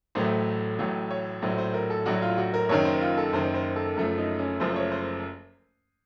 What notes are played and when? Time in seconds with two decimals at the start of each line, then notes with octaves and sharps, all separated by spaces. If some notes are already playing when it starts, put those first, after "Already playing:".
0.15 A1 A2 F#3 A3 C5
0.79 A1 A2 F#3 A3 C#5
1.11 C#5
1.42 A#1 A2 F#3 C5
1.58 C5
1.74 A#4
1.90 A4
2.05 A#1 A2 F#3 F#4
2.22 F4
2.38 F#4
2.54 A#4
2.69 F#1 F#2 D#3 C#5
2.85 C5
3.01 F4
3.17 A4
3.33 F#1 F#2 D#3 C5
3.54 C5
3.76 A4
3.96 F#1 F#2 F3 A3
4.17 D#4
4.39 C#4
4.60 F#1 F#2 F3 A3 C5
4.76 C#5
4.92 C5